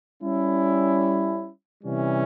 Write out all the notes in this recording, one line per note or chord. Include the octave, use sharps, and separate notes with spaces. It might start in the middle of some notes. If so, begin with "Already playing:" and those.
G3 C#4 E4
C3 E3 G3 C#4